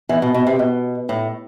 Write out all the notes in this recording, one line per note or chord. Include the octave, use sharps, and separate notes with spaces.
E2 E3
B2
B2
C3
B2
A2